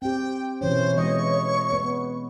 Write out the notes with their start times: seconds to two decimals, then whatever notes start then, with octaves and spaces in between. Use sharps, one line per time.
0.02 C4 G4 G5
0.61 B2 E3 C#4 C5 C#5
0.97 E3 G#3 D#5 C#6
1.72 B3